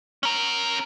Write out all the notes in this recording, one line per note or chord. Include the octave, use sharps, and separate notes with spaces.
C#4 A#4